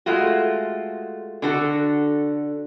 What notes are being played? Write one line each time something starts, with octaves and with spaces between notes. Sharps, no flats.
G#3 A3 F4 F#4
D3 F#4 A4